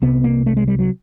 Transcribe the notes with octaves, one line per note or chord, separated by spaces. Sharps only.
C2 C3 B3
A#3
A3
G#3
G3
F#3